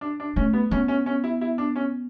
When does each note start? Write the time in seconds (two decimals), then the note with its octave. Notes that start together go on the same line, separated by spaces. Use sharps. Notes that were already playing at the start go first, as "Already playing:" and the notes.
0.01 D4
0.20 D4
0.36 A3 C#4
0.53 B3
0.71 B3 C#4
0.88 C#4
1.06 C#4
1.24 E4
1.41 E4
1.58 D4
1.76 C#4